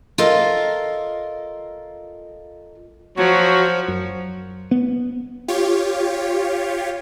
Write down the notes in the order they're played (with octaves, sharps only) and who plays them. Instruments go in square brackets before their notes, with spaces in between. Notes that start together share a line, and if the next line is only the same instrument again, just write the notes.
[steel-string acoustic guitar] F4 A4 A#4 D#5 F5
[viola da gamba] F3 [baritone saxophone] F#3 [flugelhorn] F#4
[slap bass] F#2
B3
[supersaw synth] F4 G4 C#5